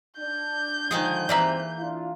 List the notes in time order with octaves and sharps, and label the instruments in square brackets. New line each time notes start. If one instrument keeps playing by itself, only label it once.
[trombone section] D4 [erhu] G6
[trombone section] D3 F3 [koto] D#3 G#3 G#4
[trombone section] G2 C3 [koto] E3 A#3 B4 [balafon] D5 E5 A#5
[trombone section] D4 E4 F4